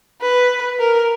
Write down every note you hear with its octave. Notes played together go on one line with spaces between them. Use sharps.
B4
A#4